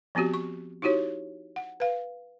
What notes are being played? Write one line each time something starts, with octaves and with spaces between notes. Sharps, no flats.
F3 B3 C4 F#4 G4
C#6
D#4 E4 F#4 G4 C#5
F#5
B4 F5